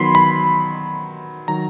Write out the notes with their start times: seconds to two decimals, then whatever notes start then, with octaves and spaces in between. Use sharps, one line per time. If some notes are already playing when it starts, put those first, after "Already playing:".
Already playing: D#3 F#3 B3 B5 C6
0.15 B5
1.48 D#3 F#3 A#5